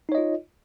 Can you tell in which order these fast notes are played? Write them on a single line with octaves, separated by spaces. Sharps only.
D#4 C#5 D#5 F4